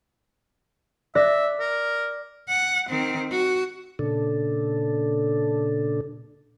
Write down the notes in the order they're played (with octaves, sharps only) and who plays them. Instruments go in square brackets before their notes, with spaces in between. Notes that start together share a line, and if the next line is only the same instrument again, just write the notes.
[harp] D5 F#6 A#6 [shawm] E5
[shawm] A#4
[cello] F#5
D#3 C4
F#4
[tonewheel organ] A#2 C#3 D4 A4